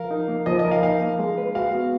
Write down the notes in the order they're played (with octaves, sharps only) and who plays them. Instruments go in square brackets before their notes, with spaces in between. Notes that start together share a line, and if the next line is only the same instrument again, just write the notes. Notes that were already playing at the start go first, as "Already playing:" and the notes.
Already playing: [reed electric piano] F3 A#4 [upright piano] F5
[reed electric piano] D#4
A#3
[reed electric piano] F3 [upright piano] D#5
[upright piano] D#5
[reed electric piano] A#4
[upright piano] F5
[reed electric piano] D#4 [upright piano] F5
[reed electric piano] A#3
G#3
B4
[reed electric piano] F#4 [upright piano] F5
[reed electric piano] B3